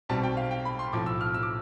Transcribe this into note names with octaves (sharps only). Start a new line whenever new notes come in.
B1 B2 G3 C4 A5
G5
F5
G5
B5
C6
B1 A2 F3 D6
E6
F6
E6
D6